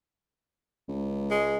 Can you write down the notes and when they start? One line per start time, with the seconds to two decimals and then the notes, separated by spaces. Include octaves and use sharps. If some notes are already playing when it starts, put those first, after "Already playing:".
0.88 C#2
1.31 G#3